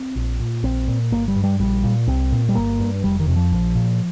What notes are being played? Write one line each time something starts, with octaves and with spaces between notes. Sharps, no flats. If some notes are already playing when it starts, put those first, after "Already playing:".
Already playing: C4
A#1
A#2
A#1 C4
A#2
G1 A#3
G3
G2
G3
A#1 G3
A#2
C2 C4
A#2
G3
G1 A#3
G2
F1 G3
D#3
F2 C3
F3
A#1
A#2